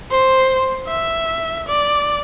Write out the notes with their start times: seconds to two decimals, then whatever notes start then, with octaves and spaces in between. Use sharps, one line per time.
0.11 C5
0.88 E5
1.68 D5